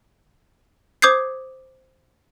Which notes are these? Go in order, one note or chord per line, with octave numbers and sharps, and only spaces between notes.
C5 D6 D#6 G6 G#6 C7